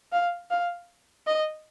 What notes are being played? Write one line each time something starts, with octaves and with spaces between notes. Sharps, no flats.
F5
F5
D#5